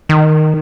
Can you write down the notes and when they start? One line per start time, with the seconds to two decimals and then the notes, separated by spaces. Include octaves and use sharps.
0.09 D#3